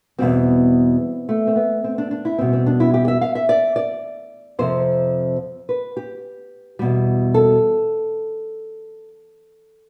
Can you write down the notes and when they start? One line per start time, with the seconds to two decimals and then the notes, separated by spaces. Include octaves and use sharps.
0.19 E2 B2 G3 C4
1.29 A3
1.47 C4
1.56 B3
1.84 C4
1.98 D4
2.11 D4
2.25 E4
2.38 E2 B2 G3 C4
2.53 C4
2.66 D4
2.80 E4
2.94 G4
3.08 E5
3.21 F5
3.35 E5
3.49 D5
3.76 D5
4.59 F2 C3 F3 C5
5.69 B4
5.97 G4
6.79 E2 B2 G3
7.34 A4